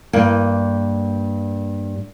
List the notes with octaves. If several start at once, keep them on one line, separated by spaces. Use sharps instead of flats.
G2 A#3